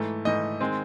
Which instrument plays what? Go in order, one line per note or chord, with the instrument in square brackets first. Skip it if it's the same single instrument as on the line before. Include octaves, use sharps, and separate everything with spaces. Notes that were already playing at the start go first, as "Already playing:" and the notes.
Already playing: [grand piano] G#2 E3 A3
G#2 E3 A3 D#5
D#3 G#3 C4